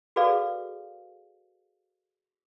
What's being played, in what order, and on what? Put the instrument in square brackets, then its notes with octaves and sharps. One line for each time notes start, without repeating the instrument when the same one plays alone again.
[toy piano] F#4 G#4 A4 B4 D5 F5